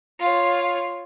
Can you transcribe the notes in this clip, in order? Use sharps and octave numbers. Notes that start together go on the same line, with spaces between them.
F4 C#5